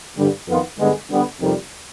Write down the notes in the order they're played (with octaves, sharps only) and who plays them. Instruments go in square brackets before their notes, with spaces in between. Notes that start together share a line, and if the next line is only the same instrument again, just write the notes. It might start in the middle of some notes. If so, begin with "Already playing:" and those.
[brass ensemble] G2 D3 G3
F2 D#3 B3 F4
G2 D3 G#3 B3
D3 G3 B3
F2 C3 D#3 G3